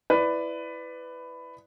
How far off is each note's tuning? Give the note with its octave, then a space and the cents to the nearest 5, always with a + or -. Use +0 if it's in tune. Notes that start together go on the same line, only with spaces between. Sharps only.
E4 +5 B4 +15 D5 +5